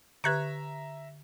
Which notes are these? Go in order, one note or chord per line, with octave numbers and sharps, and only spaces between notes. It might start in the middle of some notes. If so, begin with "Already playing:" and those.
D3 G4 B4 E5 A#5 C#6 F#6 G#6